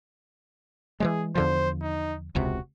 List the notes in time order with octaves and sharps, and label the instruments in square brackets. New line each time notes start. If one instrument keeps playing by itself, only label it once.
[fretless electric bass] E3 F#3 G#3 [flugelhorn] G#4
[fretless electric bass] E2 D3 F3 [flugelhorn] C5
[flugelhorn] D#4
[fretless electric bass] E1 C#2 C3 [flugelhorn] F#4